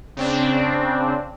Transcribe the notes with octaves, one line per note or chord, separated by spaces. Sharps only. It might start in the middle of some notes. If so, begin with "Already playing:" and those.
C#3 C4 D4